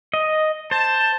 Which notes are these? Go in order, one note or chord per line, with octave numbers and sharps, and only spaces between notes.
D#5
C5 A5